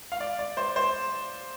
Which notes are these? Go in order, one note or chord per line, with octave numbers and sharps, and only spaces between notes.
F5
D5
D5
C5
C5